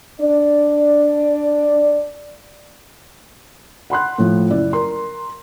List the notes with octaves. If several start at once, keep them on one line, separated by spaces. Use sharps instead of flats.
D4 D5
F#5 B5 C6 F#6
A2 F3
F#1 E4 D5
A#4 C6